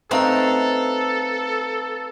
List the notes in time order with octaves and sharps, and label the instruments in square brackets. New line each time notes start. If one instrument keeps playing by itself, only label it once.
[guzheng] A3 C4 D#4 [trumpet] A4 [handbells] B4 F5 A#5